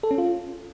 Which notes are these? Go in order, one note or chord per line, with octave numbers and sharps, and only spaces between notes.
A4
C#4
F4